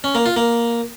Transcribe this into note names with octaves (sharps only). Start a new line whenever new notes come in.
C#4
A#3
F4
A#3